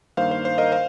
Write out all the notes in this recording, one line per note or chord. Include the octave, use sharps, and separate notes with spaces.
G2 D#3 A#3 C5 F5
C5
C5
A#4 D#5
C5 F5